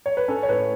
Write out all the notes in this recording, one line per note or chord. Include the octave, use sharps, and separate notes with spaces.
C#5
B4
C#4 A4
C#5
A2 B4